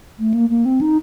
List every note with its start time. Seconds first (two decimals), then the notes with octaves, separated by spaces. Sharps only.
0.19 A3
0.34 A#3
0.50 A#3
0.65 C4
0.81 D#4